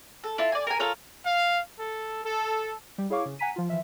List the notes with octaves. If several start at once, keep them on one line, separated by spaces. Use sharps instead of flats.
A4
E4 F4 A5
D5 G#5
A#4 G#5
F4 A4 A#4 C#5
F5
A4
A4
G3
E4 G#4 C#5 F5 C#6 D6
C#3
F#5 G#5 A#5 B6 D#7
F3 F4
E3 F3 E5